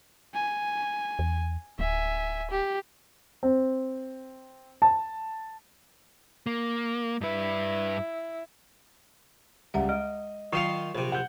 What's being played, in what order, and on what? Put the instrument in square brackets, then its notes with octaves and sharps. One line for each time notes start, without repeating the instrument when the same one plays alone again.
[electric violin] G#5
[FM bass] E2
[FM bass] D1 [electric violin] E5 G#5
[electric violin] G4
[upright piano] C4
A5
[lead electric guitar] A#3
[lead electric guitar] G2 B4 [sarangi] E4
[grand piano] C#2 G3 [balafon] E5 F#5 A#5
[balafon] G#3 [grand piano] D#5
[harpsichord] D#3 F4 F5 [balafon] F#3 [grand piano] C#6 C7 C#7
[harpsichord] A#1 C3 [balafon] C5
[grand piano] F#5 G6